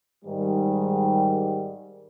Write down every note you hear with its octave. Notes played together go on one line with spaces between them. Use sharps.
G#2 D#3 G3